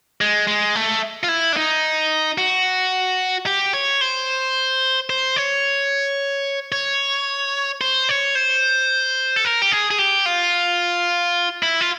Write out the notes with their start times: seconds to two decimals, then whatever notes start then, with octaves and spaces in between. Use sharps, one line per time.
0.21 G#3
0.47 G#3
0.75 A3
1.23 F4
1.29 E4
1.53 D4
1.57 D#4
2.38 F#4
3.46 G4
3.74 C#5
4.01 C5
5.10 C5
5.36 C#5
6.72 C#5
7.81 C5
8.09 C#5
8.35 C5
9.36 A4
9.45 A#4
9.62 G4
9.72 G#4
9.91 G#4
9.99 G4
10.26 F4
11.63 E4
11.81 F4